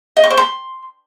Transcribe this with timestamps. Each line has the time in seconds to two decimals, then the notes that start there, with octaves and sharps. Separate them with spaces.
0.17 D#5
0.24 C#6
0.31 C5
0.37 C6